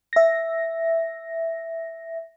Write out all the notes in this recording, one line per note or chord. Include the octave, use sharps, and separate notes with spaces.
E5 A#6